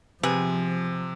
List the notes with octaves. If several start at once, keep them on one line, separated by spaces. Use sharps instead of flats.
C3 F3 B3 G#4